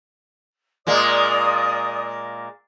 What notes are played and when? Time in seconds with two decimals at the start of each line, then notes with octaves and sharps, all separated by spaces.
0.87 A#2 G#3 A#3 D5 D#6